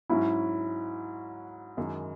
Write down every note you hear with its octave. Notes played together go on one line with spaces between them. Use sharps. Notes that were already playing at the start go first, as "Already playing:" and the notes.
G#2 F#3 C#4 E4 F#4
F#2 D#3 G#3 D#4